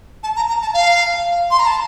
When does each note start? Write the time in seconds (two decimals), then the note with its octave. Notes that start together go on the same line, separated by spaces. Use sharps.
0.23 A5
0.36 A#5
0.49 A#5
0.62 A5
0.74 F5
1.51 C6
1.59 A#5
1.67 A5